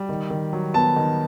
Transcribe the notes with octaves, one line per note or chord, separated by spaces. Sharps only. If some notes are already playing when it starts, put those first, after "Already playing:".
Already playing: G3
D#3
D#3
F#3
B3 A5
D#3